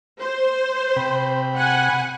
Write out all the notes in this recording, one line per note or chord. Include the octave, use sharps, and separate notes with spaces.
C5
C3 G5 B5
F#5 G#5